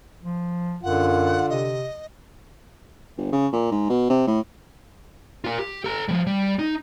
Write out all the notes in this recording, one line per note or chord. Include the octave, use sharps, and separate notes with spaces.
F3
F#2 D3 F4 F#5
C3 D#5
G1
C#3
A#2
G#2
B2
C3
A2
F4 A#4
G4
A4 A#5
F3 G3
G3
D#4